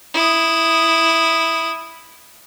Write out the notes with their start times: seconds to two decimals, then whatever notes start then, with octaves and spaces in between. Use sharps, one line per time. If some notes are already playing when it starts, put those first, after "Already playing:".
0.14 E4 D#6